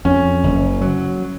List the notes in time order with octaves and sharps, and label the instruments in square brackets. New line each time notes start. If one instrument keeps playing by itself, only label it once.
[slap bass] F2 [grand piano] C#4
[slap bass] F#1
F#3